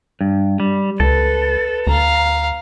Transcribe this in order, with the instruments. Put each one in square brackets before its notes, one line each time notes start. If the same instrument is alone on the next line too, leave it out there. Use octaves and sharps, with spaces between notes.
[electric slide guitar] G2
G3
[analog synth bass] C#2 [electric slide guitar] A4 [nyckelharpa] B4
[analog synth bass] D2 [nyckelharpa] F5 A#5